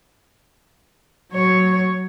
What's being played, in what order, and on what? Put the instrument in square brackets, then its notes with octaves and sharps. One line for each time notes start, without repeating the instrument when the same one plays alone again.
[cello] F#3 C#5